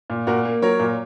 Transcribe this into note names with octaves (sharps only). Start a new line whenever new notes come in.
A#2
A#2 F#4 A#4
A#3
F#3 A#4 C#5
A#2